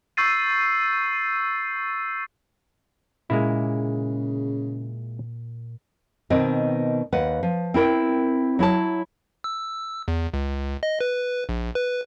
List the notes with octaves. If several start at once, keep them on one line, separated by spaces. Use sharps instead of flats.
C#6 E6 G6 A6 C7 D#7
A#2 C#3 G#3 A#3 E4
B2 D#3 C4 D#5
D#2 B4 F#5
F3
C4 E4 A#4 G5
F#3 E4 C#5 A5
E6
E2
C#2
D#5
B4
A#1
B4